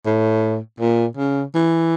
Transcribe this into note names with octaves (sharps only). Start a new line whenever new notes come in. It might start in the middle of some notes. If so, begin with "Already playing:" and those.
A2
A#2
C#3
E3